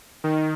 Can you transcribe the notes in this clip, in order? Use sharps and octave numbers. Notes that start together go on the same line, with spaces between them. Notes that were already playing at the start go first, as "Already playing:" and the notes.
D#3